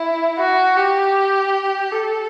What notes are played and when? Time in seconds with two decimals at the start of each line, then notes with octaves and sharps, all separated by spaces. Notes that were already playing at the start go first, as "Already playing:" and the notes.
Already playing: E4
0.38 F#4
0.76 G4
1.92 A4